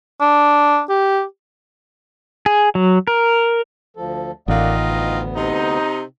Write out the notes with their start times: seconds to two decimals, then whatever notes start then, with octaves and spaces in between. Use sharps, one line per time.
0.21 D4
0.89 G4
2.46 G#4
2.75 F#3
3.07 A#4
3.97 D2 F3 A4
4.48 A1 D#3 A#3 F4 D5 D#5 F#5
4.78 D2 B3
5.35 C3 D#4